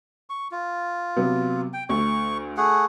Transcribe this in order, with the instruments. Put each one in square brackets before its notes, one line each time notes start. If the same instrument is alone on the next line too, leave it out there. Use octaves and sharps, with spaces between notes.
[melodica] C#6
F4
[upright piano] C3 F#3 B3
[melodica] G5
[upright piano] D2 A3 [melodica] C#6
[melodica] A3 G#4 F#5